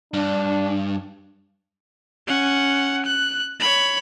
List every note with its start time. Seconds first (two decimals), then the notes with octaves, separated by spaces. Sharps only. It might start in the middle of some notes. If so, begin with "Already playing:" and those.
0.14 G2 D4
2.27 C#4 F#5
3.06 F#6
3.60 C#5 B5